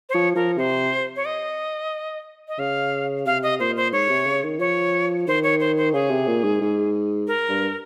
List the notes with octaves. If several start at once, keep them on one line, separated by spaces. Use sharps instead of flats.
C5
F3 C#5
F3 A#4
C3 C5
C#5
D#5
D#5
C#3 F5
C3 F5
D#5
A#2 C5
C5
G#2 C#5
C3
C#3
D#3
F3 C#5
D#3 C5
C#5
C5
C5
C#3 G#4
C3
A#2
G#2
G#2
A#4
G2